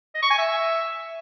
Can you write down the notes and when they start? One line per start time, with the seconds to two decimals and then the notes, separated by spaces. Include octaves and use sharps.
0.15 D#5
0.23 C#6
0.30 G#5
0.38 E5